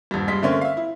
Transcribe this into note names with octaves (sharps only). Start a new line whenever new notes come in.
D#1 G2
G2 G#3 B6
D3 A3 A#3 C4 C#4
E5 F5
E4